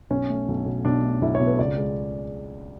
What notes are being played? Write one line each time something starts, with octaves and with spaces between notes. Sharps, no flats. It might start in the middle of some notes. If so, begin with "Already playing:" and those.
B1 C#4
A3
B1
B2
B1 D4
A3
B1 E4
C#5
B2
B4
C#2 D5
G#3